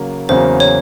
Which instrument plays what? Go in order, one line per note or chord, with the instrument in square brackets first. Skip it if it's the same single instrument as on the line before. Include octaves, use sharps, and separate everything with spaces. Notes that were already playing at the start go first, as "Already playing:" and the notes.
Already playing: [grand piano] C#3 F#3 A#3
[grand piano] E2 C#3 F#3 A#3 [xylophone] C5
[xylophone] C#5